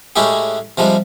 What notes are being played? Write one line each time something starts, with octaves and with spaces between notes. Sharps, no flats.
A2 G#3 C#4 E4 G4 G#4
C3 F3 G3 G#3